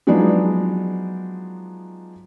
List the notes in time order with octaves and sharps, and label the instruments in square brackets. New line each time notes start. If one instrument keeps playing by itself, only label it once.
[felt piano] F3 F#3 G#3 B3 D4 D#4